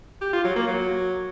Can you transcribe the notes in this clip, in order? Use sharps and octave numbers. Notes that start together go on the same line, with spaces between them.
G4
F4
F#3
A#3
F#3